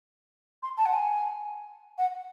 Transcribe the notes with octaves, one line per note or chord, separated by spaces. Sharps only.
C6
A5
F#5
G#5
F#5